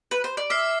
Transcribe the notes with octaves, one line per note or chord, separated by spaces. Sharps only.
B4
C5
D5
E5 D6 F6 C7